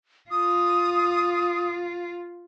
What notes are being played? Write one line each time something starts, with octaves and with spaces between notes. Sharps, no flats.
F4 D#6